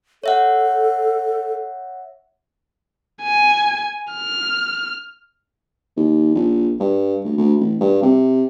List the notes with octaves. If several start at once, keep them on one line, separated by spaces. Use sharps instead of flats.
A4 C#5 E5 F#5
G#5
F6
D#2
A#1
G2
D2
D2
A1
G2
C3